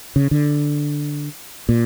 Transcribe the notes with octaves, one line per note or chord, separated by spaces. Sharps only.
C#3
D3
A#2